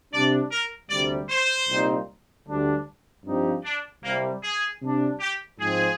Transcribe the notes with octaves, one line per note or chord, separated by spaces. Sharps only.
C3 G3 D4 D5
A#4
D2 C3 G3 D5
C5
C2 A#2 G3 C4 D#4
D2 D3 G3 D4
G2 F3 C4 D#4 G4
D4
C2 C3 G3 A#3
G#4
C3 G3 D4
G4
G#2 F3 G#3 C4 G#4